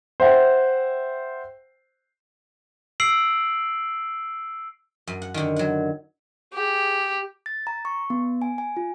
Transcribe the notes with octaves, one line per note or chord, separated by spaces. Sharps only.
C5 E5 F#5 G5
E6 C7 D7 F#7
F#2
F#5
D3 D#3
F#3 F#5
G4 G#4
A6
A#5
C#6
B3
G#5
G#5
F4